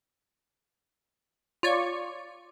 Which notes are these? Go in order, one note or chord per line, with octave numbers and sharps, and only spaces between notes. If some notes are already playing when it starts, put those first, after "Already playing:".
F4 C#5 D5 C#6